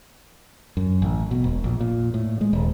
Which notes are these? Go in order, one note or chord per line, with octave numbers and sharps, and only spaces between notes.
F#2
A1
B2
E1
A#1
A#2
A2
G#3
D#1